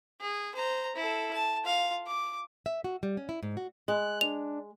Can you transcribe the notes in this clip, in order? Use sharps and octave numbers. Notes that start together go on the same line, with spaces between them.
G#4
C5 A#5
E4 A4
A5
F4 F5
D6
E5
F#4
G3
C#4
E4
G#2
F#4
G#3 F#6
D4 F7